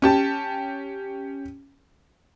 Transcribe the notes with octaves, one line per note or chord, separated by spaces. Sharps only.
C#4 G4 A5